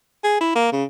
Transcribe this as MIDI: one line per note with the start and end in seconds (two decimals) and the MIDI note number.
0.24 0.40 68
0.41 0.55 64
0.56 0.70 58
0.73 0.84 49